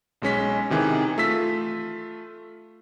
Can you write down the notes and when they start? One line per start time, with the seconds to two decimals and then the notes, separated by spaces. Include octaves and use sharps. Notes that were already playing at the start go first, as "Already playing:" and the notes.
0.22 B1 G#3 C#4 B6
0.70 C3 D#3 E3 G#4
1.18 A3 F4 E6 B6